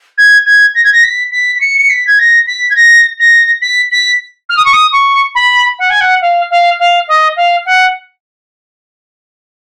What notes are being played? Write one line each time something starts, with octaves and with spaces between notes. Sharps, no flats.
G#6
G#6
A#6
G#6
A#6
B6
B6
B6
C#7
C#7
B6
G#6
A#6
B6
G#6
A#6
A#6
B6
B6
F6
D#6
C#6
D#6
C#6
B5
F#5
G#5
F#5
F5
F5
F5
D#5
F5
F#5